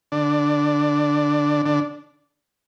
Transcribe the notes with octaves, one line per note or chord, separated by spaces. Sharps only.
D3 D4
D3 D4